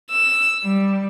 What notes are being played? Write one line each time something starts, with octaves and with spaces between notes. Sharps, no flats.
E6
G3